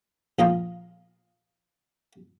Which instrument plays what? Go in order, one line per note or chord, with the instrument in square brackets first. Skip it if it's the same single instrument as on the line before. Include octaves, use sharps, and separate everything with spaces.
[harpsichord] A#1 F4 D#5 F5 A#5